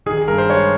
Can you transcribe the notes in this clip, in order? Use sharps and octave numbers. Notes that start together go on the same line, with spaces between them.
D#3 G#4
G#4
G2 A#4
C5
G#3 C#5